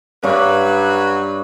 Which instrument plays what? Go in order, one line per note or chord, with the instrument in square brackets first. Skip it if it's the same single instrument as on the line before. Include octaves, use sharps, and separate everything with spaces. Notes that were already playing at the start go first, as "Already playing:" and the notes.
[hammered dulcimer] G2 C#5 D6 [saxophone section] F#3 G3 B4